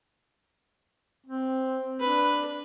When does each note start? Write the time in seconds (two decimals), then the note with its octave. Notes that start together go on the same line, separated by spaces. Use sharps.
1.26 C4
2.00 D4 B4